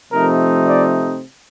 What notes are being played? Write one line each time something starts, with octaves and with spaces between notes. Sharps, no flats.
C3 F3 A3 C4 D#4 A#4
D5